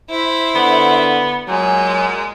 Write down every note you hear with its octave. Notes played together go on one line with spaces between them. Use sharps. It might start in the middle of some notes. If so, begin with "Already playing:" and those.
E4 C5 E5
D3 B3
A#2 F#3 G#3 G#5